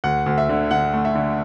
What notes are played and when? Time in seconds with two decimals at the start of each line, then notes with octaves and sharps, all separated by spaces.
0.04 D2 F#5
0.26 D2
0.38 E5
0.49 D3
0.71 D3 F#5
0.93 A3
1.05 E5
1.15 D3